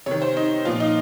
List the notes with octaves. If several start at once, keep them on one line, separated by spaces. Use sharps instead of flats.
C3 D#3 C#5
C5
D#4
A#2 F3 F4
D#4